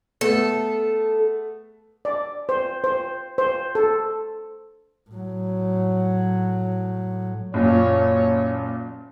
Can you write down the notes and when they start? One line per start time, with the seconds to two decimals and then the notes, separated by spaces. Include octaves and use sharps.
0.21 A3 B3 A4
2.05 D5
2.49 C5
2.84 C5
3.38 C5
3.75 A4
5.11 A2 F#3
7.54 F#1 A#2 C#5